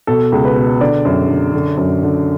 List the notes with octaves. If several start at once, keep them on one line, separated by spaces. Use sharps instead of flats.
B2 A4
C#2
B4
B2
D3 D5
F#2
D3
D3
F#2
D3